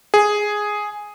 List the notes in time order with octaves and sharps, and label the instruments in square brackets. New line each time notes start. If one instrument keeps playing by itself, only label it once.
[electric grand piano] G#4